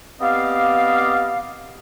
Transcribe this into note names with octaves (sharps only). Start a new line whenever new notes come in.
B3 C4 G4 D5 D#5 F5